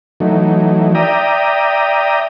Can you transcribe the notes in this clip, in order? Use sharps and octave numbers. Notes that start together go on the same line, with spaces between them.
E3 F#3 A3 D#4
D5 E5 G5 A#5 D#6